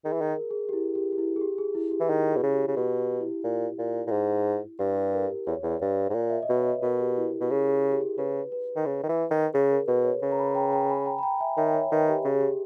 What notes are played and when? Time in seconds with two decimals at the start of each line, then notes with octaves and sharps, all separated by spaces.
0.05 D#3 G#4
0.13 E3
0.21 D#3
0.28 A#4
0.51 G#4
0.69 G4
0.73 E4
0.95 G4
1.12 G4
1.18 E4
1.36 G#4
1.41 G4
1.58 G#4
1.75 E4
1.91 G4
2.00 E3
2.09 D#3 G#4
2.31 B2 G#4
2.43 C#3
2.53 G4
2.67 C#3
2.76 B2 G4
2.99 G4
3.21 E4
3.44 A#2
3.78 A#2
4.07 A#2
4.11 G#2
4.79 G2 G4
4.96 G4
5.13 A#4
5.47 E2 C#5
5.63 E2
5.81 G2
6.10 G#2
6.14 A#2
6.29 E5
6.42 D#5
6.49 B2
6.56 C#5
6.69 B4
6.82 B2 A#4
6.99 G4
7.17 E4
7.40 B2
7.50 C#3 G#4
7.67 G#4
7.92 G4
8.01 G#4
8.18 C#3 B4
8.52 B4
8.76 D#3
8.86 C#3
9.03 D#3
9.09 E3
9.31 D#3
9.54 C#3 G#4
9.71 A#4
9.88 B2 B4
10.04 C#5
10.22 C#3
10.31 A#5
10.39 G#5 B5
10.55 G5 A#5
10.73 G5 A#5
10.90 G#5 B5
11.06 G5 A#5
11.18 B5
11.23 G5 A#5
11.40 E5 G#5
11.57 D#3 C#5 E5
11.74 C#5 E5
11.91 D#3 B4 D#5
12.09 G4
12.24 C#3 G4
12.33 G#4
12.41 G4